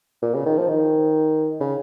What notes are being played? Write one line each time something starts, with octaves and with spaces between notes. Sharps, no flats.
A#2
C#3
D#3
F3
D#3
C#3